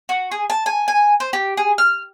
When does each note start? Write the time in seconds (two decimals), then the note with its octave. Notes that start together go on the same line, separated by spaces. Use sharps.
0.09 F#4
0.32 G#4
0.50 A5
0.66 G#5
0.88 G#5
1.20 C5
1.33 G4
1.57 G#4
1.78 F6